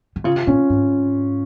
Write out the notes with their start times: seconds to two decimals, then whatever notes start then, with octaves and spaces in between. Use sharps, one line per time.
0.16 D#3
0.24 C#3 F4
0.36 C3
0.47 A#2 C#4
0.70 G#2